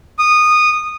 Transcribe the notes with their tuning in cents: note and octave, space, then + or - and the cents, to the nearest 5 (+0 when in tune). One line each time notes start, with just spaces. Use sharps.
D#6 -15